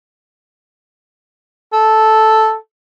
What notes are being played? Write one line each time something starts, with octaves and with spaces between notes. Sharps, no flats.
A4